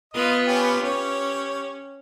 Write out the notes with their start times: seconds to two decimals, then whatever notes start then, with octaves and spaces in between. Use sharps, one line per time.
0.14 B3 F4 B4 D#5 D#6
0.47 C#4 G4 B5
0.83 C#4 G4 C#5